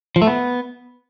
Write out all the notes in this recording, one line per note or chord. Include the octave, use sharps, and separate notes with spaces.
F3
A3
B3